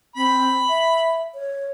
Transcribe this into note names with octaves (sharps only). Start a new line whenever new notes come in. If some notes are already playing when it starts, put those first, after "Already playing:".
C4 B5
E5
C#5